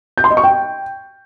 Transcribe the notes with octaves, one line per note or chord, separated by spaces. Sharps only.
G6
C6
D#5
C#6
G5